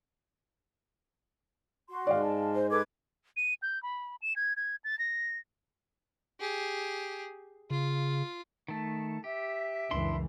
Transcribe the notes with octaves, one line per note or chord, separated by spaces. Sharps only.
F#4 C6
G#2 G#3 D5 F5
A5
C5
A4 B4 D6 G#6
D#7
G6
B5
E7
G#6
G#6
A6
A#6
G4 G#4
C#3 F4
D#3 A3 A5
G4 E5
C#2 F#2 E3 D4 E4 C6